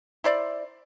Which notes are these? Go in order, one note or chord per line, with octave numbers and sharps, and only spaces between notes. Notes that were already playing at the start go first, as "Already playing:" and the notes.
E4 C5 D5